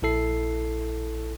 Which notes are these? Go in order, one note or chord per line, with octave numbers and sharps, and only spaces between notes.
A#1 E4 A4 C7